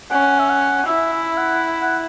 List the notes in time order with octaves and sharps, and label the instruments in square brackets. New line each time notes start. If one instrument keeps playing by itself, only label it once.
[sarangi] C#4 [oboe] F#5
[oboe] E5
F#5
[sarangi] E4 [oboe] E5
[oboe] E5
F#5
F#5